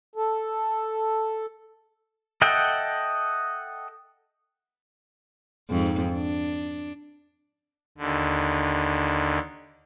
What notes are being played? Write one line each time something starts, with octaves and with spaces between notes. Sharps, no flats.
A4
A4 D#5 E5 F#5 G5
F2 G#2
D4
D#2 D3